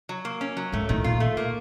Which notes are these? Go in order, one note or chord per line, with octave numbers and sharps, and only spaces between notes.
F#3
A#3
C#4
F#3
G#2 A3
A2 D#3
A#2 F4
A3
A#3